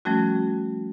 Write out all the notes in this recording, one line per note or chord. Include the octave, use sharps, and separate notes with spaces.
F3 G3 A3 C#4 F#4